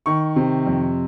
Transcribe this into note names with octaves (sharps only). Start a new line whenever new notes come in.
D#3 C#6
C3
F2